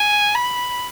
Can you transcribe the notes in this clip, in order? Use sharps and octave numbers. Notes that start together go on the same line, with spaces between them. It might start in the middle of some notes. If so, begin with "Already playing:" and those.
Already playing: G#5
B5